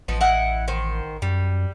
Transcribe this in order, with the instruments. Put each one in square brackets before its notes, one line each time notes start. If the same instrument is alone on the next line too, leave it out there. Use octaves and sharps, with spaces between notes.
[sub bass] A1 [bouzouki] F3 B3 D#4
[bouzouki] E4 D#5 F#5
D#3 C5
[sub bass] F#2 [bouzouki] G3